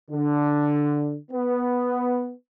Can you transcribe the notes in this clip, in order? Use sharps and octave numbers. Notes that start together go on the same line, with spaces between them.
D3
B3